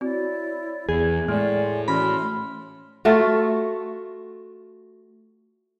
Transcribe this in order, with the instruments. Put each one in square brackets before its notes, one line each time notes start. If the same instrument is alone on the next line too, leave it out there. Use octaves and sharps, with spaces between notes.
[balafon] C4 F#4 [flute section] E4 C#5 D5
[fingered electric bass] E2 [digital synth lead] G#4
[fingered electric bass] A2 [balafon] G#3 [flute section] D5 G#5 C6
[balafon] E3 C#4 F#4 [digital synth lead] B5 [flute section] C6 F6
[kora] A3 F4 F#4